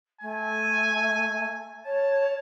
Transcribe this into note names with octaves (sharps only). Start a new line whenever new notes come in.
A3 G#5
C#5 A5